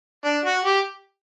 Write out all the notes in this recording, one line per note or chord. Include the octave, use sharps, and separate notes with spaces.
D4
F#4
G4